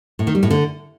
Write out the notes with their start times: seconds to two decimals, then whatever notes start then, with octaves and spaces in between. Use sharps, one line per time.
0.19 A2
0.27 D#3
0.35 G3
0.43 A2
0.50 D3